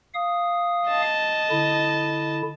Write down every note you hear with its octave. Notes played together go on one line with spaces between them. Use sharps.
F5 D#6
D#5 A5
D3 E4